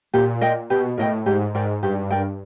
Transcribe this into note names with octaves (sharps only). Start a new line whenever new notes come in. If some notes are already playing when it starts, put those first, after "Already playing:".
A#2 G4
A#4 D#5 G5
B2 G4
A2 A#4 D#5 G5
G#2 G4
G#2 A#4 D5 G5
G2 G4
A#4 D5 G5